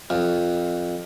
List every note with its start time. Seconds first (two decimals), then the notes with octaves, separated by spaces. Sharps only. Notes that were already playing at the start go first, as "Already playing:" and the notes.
0.10 F2